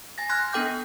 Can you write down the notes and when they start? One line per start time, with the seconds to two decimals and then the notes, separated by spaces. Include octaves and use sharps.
0.18 G#5 A6 A#6
0.29 C6 F6 F#6 G#6 A#6
0.53 B3 D4 A4 G5 D6 G6